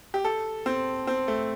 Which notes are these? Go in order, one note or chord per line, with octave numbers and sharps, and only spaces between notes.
G4
A4
C4
C4
A3